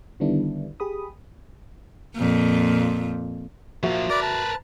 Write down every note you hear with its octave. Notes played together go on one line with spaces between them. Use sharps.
D3 D#3 G3 B3 D4 E4
G4 G#4 B5 D#6
F2 A#2
F3 A#3 F#4 E5
A#4 B4 D5 D6
A5